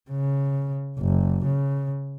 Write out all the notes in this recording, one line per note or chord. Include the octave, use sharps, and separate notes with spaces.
C#3
F#1
C#3